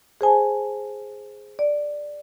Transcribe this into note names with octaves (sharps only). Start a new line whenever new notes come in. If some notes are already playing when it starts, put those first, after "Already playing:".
G#4 C5 G#5 A5
D5